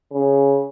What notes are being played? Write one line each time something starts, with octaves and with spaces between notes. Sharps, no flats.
C#3